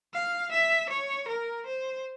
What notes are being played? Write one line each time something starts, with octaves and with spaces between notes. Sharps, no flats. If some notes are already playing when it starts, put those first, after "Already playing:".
F5
E5
C#5
A#4
C5